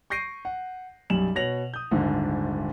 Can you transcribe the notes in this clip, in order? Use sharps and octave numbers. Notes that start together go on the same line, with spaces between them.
C#6 G6 A#6 C7 D7 D#7
F#5
B1 F#2 G3 E7 F#7
B2 C#5 A#6 F7 F#7
D#6 G6
D#1 G#1 G#2 D3